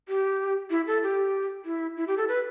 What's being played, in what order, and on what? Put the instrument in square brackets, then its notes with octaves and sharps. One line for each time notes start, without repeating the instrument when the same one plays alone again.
[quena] G4
E4
A4
G4
E4
E4
G4
A4
B4